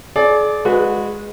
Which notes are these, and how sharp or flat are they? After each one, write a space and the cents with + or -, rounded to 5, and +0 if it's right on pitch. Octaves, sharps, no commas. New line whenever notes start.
G#4 +40 D5 +0
G#3 +0 F#4 -25 B4 +0